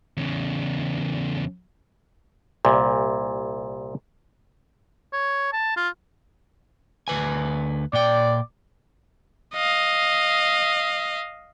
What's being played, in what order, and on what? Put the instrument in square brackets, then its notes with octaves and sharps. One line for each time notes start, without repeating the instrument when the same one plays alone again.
[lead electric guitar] E2 C#3
[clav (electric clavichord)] C2 A#2
[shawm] C#5
A5
F4
[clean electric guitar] D2 B4 G#5
[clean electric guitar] A#2 G5 [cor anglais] D5
[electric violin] D#5 F5